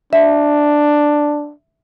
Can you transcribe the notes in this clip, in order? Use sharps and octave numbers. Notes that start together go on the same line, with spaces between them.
D4 E5